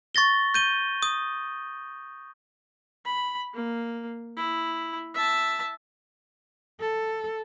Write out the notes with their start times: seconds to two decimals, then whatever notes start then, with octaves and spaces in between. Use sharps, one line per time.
0.15 C#6 A6 A#6 G7
0.54 G6 D#7 G7
1.03 D#6
3.05 B5
3.54 A#3
4.37 E4
5.14 E5 A5
6.80 A4